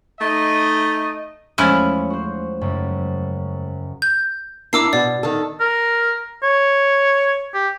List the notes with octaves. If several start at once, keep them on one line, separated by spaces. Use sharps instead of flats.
A3 D#4 D#5
E2 F3 G#3 A3 C#4 E4
F#4 C5
F#1 F#2
G6
D4 E4 A#4 D6 E6 C7
B2 D5
D#3 A4
A#4
C#5
G4